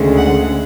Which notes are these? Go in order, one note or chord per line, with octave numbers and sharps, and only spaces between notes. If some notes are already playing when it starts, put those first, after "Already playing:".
Already playing: D2 C#3 G#3
F#5